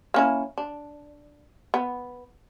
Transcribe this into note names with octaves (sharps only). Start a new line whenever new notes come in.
A#3 C#4 E4
D4
B3